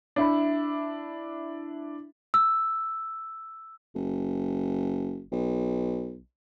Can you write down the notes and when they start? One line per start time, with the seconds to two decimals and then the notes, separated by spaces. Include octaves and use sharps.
0.16 D4 E4 E5 B5
2.34 E6
3.95 F#1
5.32 B1